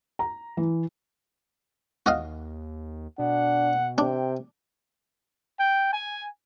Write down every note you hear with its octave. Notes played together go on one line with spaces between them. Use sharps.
A#5
E3
D#2 F#4 D#5 F5
B2 D4 F#5
C3 D4 G5
G5
G#5